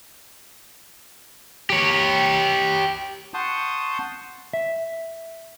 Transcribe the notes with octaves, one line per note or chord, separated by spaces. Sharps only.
G4 C#5
F#5 A5 C6 C#6 D#6 G6
E5